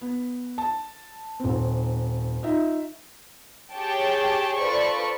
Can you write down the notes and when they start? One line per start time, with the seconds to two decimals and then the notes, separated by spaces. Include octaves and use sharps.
0.01 B3
0.58 A5
1.40 D#1 C4
2.43 D#4 F4 E5
3.74 G4 G#4 C#5 G5 A5
4.58 F4 A4 B4 C5 D5 C#6